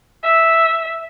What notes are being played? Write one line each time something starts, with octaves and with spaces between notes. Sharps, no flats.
E5